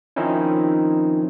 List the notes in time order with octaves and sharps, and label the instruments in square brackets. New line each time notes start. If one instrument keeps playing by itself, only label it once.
[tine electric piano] D#3 F3 C4 C#4 D#4 E4